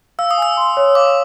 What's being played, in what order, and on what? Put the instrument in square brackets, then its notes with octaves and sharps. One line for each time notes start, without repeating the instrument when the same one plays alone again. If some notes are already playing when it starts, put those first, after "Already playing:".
[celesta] F5 [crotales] E6
[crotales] D#6
[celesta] G#5 [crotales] E6
[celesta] C6
C#5
[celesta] F5 [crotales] D6